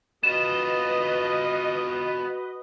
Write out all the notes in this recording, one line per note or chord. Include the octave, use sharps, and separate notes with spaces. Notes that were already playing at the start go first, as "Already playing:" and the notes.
B3 F4 F#4 B4 D#5 E7